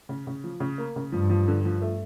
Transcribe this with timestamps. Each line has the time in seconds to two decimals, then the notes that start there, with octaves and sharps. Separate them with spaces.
0.09 C#3
0.27 C#3
0.44 F3
0.60 C#3
0.78 A#3
0.96 C#3
1.12 G2 F3
1.30 F3
1.48 D3
1.65 F3
1.82 A3